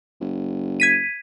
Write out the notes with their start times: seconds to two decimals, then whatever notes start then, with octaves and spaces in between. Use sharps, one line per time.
0.21 F#1
0.80 G#6 B6 D#7